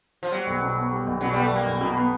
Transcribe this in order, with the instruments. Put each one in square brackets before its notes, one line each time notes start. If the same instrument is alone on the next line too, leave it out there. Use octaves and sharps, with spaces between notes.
[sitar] F3
[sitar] F#3 [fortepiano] G3
[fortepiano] B1
B2
B3
G3
B1
[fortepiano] B2 [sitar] F#3
[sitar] G3
[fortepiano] B3
[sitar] A3
[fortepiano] G3 [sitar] A#3
[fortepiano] B1
B2
B3